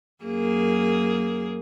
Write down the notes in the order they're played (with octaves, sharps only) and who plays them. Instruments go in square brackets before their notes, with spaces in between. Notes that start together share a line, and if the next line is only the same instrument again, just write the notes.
[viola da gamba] F#2 A#3 G#4